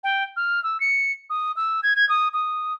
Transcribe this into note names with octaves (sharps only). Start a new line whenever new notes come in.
G5
F6
E6
C#7
D#6
E6
G#6
G#6
D#6
D#6